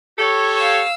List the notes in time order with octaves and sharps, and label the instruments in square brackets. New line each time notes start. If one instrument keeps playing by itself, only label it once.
[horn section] G4 A4 C#5
[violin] F5 E6